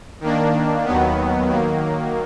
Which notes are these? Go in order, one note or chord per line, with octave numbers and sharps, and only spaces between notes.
D#3 A#3 D4
D#2 D#3 F#3 B3
D#3 F#3 A#3